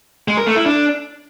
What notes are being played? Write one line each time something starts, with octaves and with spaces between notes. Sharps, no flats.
G#3
A#4
A3
E4
D4